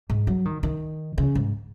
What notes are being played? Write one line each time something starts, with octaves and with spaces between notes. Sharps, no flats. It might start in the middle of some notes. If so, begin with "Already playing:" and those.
G#2
F#3
D#3
D#3
C#3
G#2